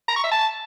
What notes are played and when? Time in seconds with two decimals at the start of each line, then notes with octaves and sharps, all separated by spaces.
0.09 A#5
0.16 C#6
0.24 E5
0.32 A5